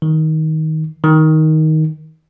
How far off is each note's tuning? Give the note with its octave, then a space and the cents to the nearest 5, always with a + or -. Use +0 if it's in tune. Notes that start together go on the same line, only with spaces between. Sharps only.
D#3 +15
D#3 +10